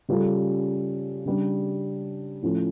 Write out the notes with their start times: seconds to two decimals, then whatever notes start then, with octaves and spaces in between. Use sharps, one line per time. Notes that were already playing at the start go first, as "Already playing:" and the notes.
0.09 C#3 G3 C#4 F4 A4
1.26 C#3 G3 D4
2.42 A2 F3 C#4